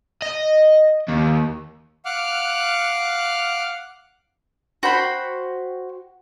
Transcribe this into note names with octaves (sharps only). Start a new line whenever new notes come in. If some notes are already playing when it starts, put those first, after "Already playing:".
D#5
D#2
F5 F#5 D6 F6 F#6
F#4 C5 G5 B5